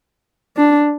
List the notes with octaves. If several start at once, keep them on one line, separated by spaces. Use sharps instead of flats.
D4